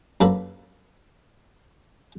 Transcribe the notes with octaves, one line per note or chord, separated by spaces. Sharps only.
F#2 A#3 A4 B4 B5